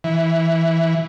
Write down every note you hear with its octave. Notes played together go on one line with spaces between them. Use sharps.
E3